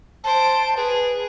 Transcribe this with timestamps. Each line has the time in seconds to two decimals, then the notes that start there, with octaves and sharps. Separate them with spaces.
0.24 C5 A5 D7
0.77 G#4 B4